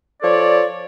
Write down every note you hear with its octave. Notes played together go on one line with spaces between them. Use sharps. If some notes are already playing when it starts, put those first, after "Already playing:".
F3 A4 C#5 D5